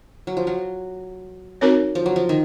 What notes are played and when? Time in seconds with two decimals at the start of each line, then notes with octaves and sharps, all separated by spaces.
0.27 F#3
0.37 F3
0.47 F#3
1.61 C4 D#4 F#4 A#4 C#5
1.95 F3
2.06 F#3
2.16 F3
2.29 D#3